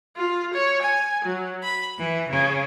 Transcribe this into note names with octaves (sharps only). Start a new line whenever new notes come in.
F4
C#5
G#5
F#3
B5
E3
C#3